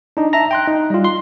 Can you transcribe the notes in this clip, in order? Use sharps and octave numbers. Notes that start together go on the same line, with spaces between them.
D4 D#4
E5 A5 A#5 A#6
G5 C6 F#6
D#4
G3 F4
C6